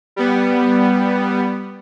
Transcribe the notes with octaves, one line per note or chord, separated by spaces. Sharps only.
G3 B3